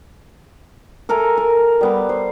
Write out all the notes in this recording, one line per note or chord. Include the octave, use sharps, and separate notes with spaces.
A4 A#4 E5 G#5
A#4
G3 B3 G4
C5